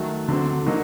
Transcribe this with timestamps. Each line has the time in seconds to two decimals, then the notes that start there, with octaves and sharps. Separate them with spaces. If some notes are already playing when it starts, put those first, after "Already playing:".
Already playing: D#3 F#3 A3
0.28 D3 F#3 C4
0.66 D3 F#3 A#3 D#4